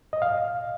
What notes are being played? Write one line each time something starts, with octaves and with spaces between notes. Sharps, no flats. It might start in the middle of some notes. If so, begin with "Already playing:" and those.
D#5
F5